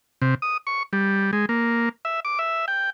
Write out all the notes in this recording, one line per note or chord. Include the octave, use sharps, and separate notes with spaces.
C3
D#6
C#6
G3
G#3
A#3
E5
D6
E5
G5